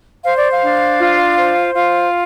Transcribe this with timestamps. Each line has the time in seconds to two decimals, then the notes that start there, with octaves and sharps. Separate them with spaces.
0.23 C5 F5
0.37 D5
0.51 F5
0.61 D4
0.99 F4
1.36 C5
1.74 F4 F5